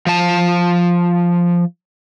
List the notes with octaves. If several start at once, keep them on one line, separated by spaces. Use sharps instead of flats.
F3 A5